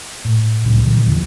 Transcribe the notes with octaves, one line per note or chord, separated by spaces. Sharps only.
A2
C#2 A2 F#3
A#2 D3 E3 F#3
E2 D3 E3 F3